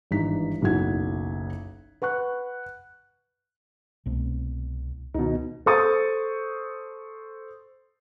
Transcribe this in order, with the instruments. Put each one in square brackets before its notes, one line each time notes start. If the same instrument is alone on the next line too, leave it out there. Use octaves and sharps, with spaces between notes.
[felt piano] G#1 G2 E3 D#4 B6
F#1 B1 E4 F#4 F#5 G#6
B4 F#5 C#6 F#6
[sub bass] C2 [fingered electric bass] B2 A3 C4
[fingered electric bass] C#2 D#3 [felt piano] B2 D#4
[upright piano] A4 C5 C#6 D#6 A6